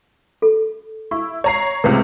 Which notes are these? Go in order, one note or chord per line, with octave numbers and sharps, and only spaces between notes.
A4
E4 C#6
C#5 A#5 C7
C#2 A2 C3 B4 C5